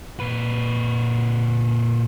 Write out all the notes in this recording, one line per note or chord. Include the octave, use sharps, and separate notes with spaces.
A#2 B4